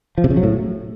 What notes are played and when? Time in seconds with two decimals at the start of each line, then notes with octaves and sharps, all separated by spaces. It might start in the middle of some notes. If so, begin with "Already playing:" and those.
0.18 F3
0.24 C3
0.30 C#3
0.37 F#3
0.43 A2